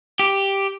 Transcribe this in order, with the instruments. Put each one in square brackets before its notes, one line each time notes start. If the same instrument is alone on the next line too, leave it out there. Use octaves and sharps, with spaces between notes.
[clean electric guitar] G4